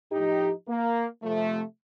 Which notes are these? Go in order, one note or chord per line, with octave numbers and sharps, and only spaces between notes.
A2 F3 D#4 G4
A#3
C3 F3 A3